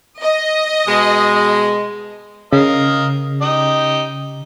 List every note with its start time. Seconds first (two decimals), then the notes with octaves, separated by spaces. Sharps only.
0.21 D#5
0.88 B2 G#3
2.53 C#3 A#4 D#5 F5
3.41 D#4 G4 D#5